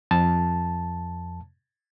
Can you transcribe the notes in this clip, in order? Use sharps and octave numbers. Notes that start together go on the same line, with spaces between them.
F2 A5